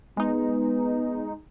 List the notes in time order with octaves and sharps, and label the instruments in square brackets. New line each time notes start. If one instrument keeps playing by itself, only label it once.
[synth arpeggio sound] G#3 D#4 [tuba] B3